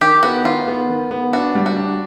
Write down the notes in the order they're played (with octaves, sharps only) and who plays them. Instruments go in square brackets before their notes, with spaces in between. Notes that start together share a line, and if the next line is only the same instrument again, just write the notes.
[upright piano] D#3 [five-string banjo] G4
[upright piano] B3 [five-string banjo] F#4
[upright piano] D#3 [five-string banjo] F4
[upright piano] B3
D#3
B3
[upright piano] D4 [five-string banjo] F#4
[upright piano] G3
[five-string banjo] F#4
[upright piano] D4